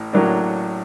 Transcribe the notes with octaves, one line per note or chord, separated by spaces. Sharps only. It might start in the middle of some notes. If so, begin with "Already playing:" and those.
Already playing: A1 A2
A1 A2 F#3 A#3 D4